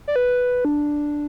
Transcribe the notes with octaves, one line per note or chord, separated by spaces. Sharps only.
D5
B4
D4